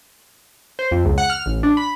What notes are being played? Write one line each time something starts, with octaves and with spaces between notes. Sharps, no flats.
C5
F2
C#2
F#5
F6
A1
D4
B5